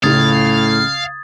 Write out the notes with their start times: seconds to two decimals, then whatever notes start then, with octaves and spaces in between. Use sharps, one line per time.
0.03 C#2 A2 C#3 F5 D#6 G#6 A6